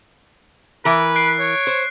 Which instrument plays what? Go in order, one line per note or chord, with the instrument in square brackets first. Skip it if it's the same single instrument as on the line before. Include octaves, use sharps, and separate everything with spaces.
[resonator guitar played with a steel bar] E3 A#4 [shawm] B4
[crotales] F#6 C7 D7
[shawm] C#5
[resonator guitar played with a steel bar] C5